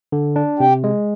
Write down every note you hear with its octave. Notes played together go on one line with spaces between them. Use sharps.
D3
D4
C3 G4
G#3